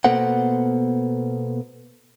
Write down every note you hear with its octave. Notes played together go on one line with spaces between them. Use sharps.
B2 A#3 B3 A4 C5 F#5